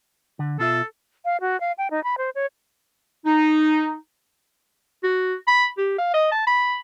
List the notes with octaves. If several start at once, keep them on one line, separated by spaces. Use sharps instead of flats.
D3
B2 F4 A4 E5
F5
F#4
F5
G5
D#4
B5
C5
C#5
D#4
F#4
B5
G4
F5
D#5
A5
B5